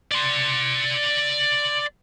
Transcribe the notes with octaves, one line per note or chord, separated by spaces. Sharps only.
D5 C6